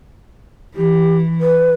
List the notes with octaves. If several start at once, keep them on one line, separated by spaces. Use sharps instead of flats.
E3 G4
B4